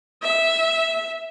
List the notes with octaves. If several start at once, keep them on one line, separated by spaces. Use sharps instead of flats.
E5